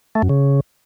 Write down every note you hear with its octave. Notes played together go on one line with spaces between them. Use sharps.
A3
F#2
C#3